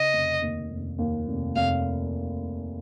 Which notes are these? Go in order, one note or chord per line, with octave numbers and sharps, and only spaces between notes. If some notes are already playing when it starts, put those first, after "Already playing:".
Already playing: C#3 D#5
F1
D#2
F1
D#2
F1
F1 F5